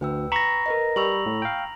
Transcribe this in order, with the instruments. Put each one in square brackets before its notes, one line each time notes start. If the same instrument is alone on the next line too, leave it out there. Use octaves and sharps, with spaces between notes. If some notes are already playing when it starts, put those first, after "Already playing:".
[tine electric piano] D2 [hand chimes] B4 G5 E6
[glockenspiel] A#5 A#6 [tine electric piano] B5 C#6
[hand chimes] A#4 B4 D#5
[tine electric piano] G3 [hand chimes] B5 C#6 E6 [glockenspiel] F7 F#7
[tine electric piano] A2
F5 G5